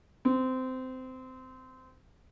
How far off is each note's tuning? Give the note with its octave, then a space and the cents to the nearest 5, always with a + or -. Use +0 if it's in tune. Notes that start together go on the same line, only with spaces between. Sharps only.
C4 -20